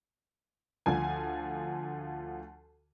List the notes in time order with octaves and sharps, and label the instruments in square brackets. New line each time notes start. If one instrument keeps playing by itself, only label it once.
[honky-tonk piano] D2 F3 G#5